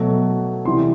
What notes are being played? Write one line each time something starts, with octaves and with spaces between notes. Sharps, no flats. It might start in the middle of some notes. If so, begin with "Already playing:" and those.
Already playing: B2 F#3 A3
C3 E3 G3 C6